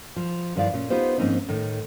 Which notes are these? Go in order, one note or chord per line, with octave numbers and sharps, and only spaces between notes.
F3
G2 D#3 F3 E4 D5 F5
A#2 C#4
B3 D#4 F4 G4 C5
G#2 F3 A#3 C4 C#4 D#4
A2 D#3